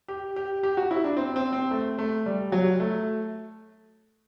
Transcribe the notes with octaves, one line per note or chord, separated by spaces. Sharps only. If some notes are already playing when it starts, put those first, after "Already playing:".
G4
G4
G4
F#4
E4
D4
C4
C4
C4
A3
A3
G3
F#3
A3